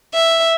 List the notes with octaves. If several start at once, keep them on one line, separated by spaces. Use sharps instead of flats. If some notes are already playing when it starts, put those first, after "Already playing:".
E5